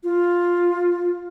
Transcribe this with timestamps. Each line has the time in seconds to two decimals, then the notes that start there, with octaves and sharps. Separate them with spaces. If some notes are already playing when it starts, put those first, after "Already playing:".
0.04 F4